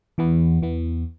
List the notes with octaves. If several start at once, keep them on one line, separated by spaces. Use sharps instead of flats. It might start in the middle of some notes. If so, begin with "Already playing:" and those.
E2 E3 B3
E2 E3 B3